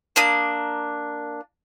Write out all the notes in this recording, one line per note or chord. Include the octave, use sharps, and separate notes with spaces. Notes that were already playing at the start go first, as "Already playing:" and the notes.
A#3 D4 D#6